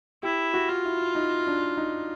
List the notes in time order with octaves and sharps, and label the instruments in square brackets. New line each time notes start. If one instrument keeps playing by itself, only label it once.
[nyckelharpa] E4 [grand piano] G4
[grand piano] F#4
[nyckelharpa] F4
[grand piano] E4
D#4
D4
D#4